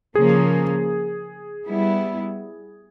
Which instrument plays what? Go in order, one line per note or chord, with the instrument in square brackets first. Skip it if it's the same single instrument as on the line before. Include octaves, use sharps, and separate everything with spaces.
[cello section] C#3 F3 A#3 [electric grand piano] G#4
[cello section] G3 B3 E4